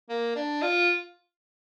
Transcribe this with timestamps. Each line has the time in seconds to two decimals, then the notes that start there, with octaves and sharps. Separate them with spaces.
0.09 A#3
0.35 D4
0.62 F4